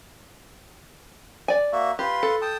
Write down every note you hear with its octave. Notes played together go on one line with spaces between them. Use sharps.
D5 G#5
A#3 F#4 E5
F4 G4 B4 C6
A4
G5 A5 D#6